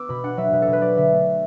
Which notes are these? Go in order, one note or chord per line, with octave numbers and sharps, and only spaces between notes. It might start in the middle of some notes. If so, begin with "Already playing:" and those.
Already playing: B3 D6 E6
B2 B5
D4 F#5
F#3 E5
B2 B4
A4
B2
B4
F#3 D5
D3 E5
A3